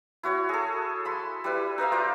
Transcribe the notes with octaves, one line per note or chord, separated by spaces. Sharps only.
E4 F#4 C#5
G#4 A4
A5 B5 C6
G3 E4 B4
D#4 B4 E5 F5
F4 C5 D5 A#5